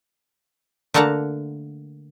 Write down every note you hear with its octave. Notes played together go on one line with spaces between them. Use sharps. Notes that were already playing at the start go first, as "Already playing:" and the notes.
D3 A3 A#3 F#5 A5 A#5